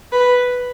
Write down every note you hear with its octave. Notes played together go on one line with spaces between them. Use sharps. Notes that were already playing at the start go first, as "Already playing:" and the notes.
B4